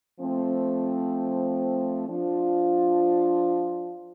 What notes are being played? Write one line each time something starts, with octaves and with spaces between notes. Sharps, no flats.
F3 A3 C4
F3 D4 F4